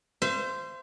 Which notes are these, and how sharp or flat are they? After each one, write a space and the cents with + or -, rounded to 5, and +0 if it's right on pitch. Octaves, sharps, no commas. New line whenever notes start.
C5 -10 E5 +45